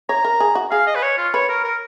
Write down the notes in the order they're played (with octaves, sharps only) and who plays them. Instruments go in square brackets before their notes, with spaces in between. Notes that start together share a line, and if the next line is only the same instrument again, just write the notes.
[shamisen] C#5 [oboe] A#5
[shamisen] A#4
G#4
F#4
[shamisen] G#4 [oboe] F5
[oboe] D#5
B4
C#5
F4
[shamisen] B4 [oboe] C#5
[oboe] A#4
A#4